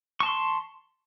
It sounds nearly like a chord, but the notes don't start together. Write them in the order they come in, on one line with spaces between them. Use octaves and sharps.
C#6 A5 C6